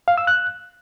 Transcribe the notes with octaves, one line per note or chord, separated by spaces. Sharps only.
F5
E6
F#6